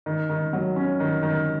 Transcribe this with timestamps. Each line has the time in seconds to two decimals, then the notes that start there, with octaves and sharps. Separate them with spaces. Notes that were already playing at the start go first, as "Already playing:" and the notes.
0.06 D#3
0.29 D#3
0.53 F#3
0.76 C#4
1.00 D#3
1.23 D#3